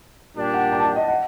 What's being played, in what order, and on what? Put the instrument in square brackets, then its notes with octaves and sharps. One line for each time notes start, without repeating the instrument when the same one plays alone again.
[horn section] A#2 G3 D4 G4
[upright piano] F#5
G5
A5
G5
D#5
F#5